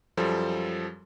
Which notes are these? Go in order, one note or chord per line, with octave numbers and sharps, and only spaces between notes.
F#2 F3 G3 A4